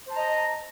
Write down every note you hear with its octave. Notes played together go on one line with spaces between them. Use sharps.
C5 D#5 A5 A#5